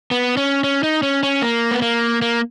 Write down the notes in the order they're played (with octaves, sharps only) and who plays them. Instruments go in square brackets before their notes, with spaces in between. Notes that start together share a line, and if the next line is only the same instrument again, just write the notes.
[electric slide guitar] B3
C#4
C#4
D#4
C#4
C#4
A#3
B3
A#3
A#3